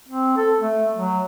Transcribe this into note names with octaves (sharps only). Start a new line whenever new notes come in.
C4
A4
A3
F#3